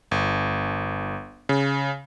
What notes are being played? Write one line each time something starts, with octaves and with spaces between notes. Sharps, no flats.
G1
C#3